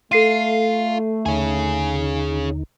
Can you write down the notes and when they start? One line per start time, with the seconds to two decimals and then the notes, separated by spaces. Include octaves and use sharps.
0.12 A3 F4 A4 C7 D#7
1.26 D#2 D3 C#4 D#4 G#4